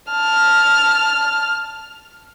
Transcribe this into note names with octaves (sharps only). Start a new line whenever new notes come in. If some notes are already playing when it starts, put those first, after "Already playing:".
A5 F6